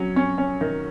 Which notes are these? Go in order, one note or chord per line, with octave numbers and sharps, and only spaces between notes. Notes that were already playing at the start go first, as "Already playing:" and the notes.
Already playing: F#3 C#4
C#4
C#4
D#3